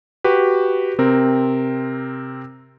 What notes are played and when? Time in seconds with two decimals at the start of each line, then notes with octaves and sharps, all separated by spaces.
0.24 F#4 G4 B4
0.99 C3 C4 A#4